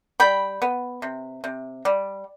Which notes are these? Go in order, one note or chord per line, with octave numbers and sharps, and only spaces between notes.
G3 G5 B5
B3
C3
C3
G3